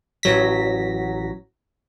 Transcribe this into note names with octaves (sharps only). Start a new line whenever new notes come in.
A1 F#3 A#6 B6